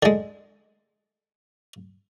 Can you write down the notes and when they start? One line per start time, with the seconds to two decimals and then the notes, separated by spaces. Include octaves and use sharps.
0.03 D3 G#3